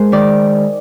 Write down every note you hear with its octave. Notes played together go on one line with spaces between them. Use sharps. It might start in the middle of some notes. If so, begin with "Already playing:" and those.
Already playing: G#3 A#4 C5
D#3 D5